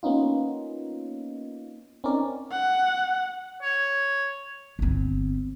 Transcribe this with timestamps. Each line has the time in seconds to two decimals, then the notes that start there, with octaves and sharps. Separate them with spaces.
0.03 A#3 B3 C#4 D#4 F4
2.04 C4 C#4 D#4 A#4 D5
2.52 F#5
3.62 C#5
4.79 G1 C4